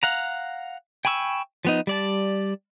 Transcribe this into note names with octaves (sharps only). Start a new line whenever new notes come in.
F5 F#5 A#5
G5 G#5 B5 C#6 E6
F3 B3 D#4
G3 D5 A5